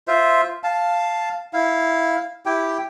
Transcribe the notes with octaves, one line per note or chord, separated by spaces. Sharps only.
F4 C5 E5
F5 A5
E4 F5
E4 G4 G5